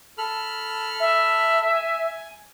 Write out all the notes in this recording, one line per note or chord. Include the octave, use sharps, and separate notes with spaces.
A4 B5 F6
E5
G#5